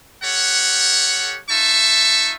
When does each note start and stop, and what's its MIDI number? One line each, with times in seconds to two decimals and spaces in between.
0.22 1.38 67
0.22 1.38 69
0.22 1.38 73
0.22 1.38 78
1.50 2.35 63
1.50 2.35 65
1.50 2.35 76
1.50 2.35 81
1.50 2.35 85